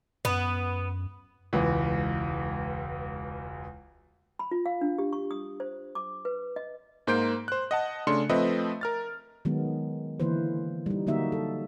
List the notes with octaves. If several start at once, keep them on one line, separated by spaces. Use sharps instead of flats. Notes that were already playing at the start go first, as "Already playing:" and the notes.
F#2 B3
E1 C#2 E3
B5
F4
F5
D4
G4
C#6
D#6
C5
D6
B4
D#5
G#2 A#3 C5 G6 D7
C5 F#6
D#5 F#5 A5
C#3 A3 D4 C6 C#7
F3 A3 C4 B4 D#5 E5
A#4 F6 A6
D#3 F#3 G#3 B3
D3 E3 A#3 E4 B4 C5
G3 D#4
D3 F#3 A#3 D#4 F#4 E5
A4